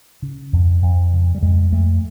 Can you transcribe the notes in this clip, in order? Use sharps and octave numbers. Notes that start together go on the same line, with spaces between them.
C#3
F2
F2
C#3
G3
F2 G#3
F2 A3